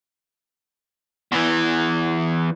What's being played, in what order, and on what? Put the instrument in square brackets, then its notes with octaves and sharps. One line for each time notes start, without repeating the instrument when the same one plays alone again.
[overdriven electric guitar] E2 E3